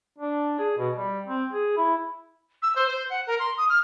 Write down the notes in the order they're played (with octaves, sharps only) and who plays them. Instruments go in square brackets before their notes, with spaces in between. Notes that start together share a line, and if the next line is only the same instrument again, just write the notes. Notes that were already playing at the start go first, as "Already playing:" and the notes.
[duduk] D4
G#4
B2
G3
C4
G#4
E4
[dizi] E6
C5
C5
F#5
A#4
C6
D#6
F6